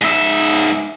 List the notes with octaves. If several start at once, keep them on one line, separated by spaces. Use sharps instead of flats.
G#2 E5